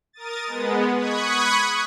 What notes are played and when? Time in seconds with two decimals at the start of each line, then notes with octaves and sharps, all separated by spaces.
0.13 A#4 D#6 A6
0.47 G#3 B3
0.96 B5 C#6 D#6 F#6 G#6